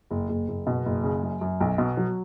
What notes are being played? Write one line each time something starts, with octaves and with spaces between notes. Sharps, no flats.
F#1
F#1
F#1
B2
F#1
C#3
F#2
F#2
B1
B2
F#3